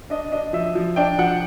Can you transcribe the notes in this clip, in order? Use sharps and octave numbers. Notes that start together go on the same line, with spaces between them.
D4 D#5
D4 D#5
F3 E5
F3
D4 G5
F3 F#5